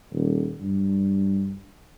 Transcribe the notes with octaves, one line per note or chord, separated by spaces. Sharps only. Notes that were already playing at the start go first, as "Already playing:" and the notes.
D#1
G2